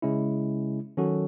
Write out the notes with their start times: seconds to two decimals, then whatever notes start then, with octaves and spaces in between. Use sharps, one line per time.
0.02 C#3 G#3 C#4 E4
0.97 D#3 F#3 C#4 F#4 A4